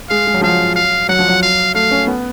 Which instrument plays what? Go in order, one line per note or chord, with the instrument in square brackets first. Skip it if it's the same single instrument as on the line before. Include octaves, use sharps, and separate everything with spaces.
[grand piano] G#3 [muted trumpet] F5
[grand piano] G#3
F#3
[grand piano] F3 [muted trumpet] F5
[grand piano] F#3
[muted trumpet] F5
[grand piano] F#3 [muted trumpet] F#5
[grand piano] F3
F#3
[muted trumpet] F5
[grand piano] A3 [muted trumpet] F5
[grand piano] C#4
B3